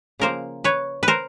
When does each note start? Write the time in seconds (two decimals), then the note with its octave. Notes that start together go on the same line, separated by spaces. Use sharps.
0.20 C#3 F3 A#3 A#4 C5
0.64 B4 C#5
1.03 B4
1.08 A#4 C5